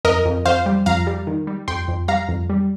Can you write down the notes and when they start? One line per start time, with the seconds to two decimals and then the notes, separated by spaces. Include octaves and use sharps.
0.05 F2 A#4 D#5
0.25 F2
0.46 F2 C5 F5
0.66 G3
0.86 F2 F5 A#5
1.07 G3
1.27 D#3
1.47 G3
1.68 F2 G5 C6
1.88 F2
2.08 G3 F5 A#5
2.29 F2
2.50 G3